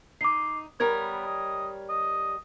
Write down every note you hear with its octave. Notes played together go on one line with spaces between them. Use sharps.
D#4 D6 C7
G3 B3 A#4 C#5 G#6
D#5
D#5